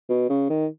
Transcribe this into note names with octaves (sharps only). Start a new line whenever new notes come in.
B2
C#3
D#3